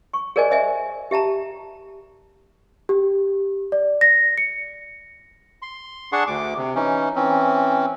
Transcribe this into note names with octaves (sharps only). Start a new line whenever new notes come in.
C#6
G#4 A#4 C5 D5 D#5 G#5
C5 D#5 E5 G#5
G4 E5 A5 A#5
G4
D5
A#6
C#7
C6
D4 G#4 F#5 A5 C6 C#6
D2 D6
C3
E3 C#4 D#4
E3 C4 C#4